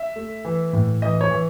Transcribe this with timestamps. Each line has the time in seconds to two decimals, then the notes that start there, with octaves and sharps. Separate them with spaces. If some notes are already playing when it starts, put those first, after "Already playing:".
Already playing: E5
0.16 A3
0.45 E3
0.73 A2
1.02 E3 D#5
1.21 C#5
1.31 E3